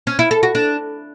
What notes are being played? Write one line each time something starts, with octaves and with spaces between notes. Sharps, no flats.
C#4
E4
A4
F#4
D4